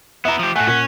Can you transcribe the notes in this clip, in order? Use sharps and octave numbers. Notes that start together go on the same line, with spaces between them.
B3 E4 E5 A#5
F3 G4
A2 A3 F#5 G#5
A#2 C#4 A#4 B6